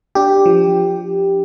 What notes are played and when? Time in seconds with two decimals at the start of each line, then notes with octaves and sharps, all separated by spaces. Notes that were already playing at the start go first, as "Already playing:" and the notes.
0.15 D4 G4
0.46 F3